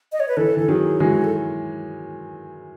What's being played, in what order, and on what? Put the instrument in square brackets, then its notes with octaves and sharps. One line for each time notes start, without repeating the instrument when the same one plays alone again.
[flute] D#5
C#5
B4
[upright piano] E3 [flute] A4
[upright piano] E3 [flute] A4
[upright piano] D#3 F#3 [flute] G#4
[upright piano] E3 G#3 [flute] F#4
[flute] A4